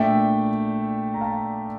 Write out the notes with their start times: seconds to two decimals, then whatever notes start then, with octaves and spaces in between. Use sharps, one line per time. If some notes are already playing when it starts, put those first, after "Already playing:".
Already playing: A#2 A3 D4 E5 G5
1.14 A#5
1.21 F5 A5